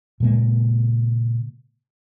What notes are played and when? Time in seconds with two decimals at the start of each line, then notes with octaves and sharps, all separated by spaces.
0.20 A#2 C#3 G#3 A#3